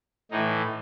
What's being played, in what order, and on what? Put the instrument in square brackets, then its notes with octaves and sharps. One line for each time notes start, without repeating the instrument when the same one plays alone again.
[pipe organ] A2 E3 D#4